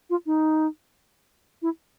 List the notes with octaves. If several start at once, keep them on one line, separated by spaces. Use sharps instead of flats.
F4
D#4
E4